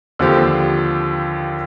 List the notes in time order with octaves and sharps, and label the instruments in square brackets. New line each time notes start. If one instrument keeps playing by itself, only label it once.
[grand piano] D#2 D3 F3 C4 G4